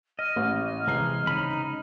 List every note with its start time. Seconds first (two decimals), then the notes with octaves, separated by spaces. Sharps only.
0.19 D#5 F6
0.36 A1
0.87 C3 E3 G#3 A#5 C7
1.27 C#3 D#4 B5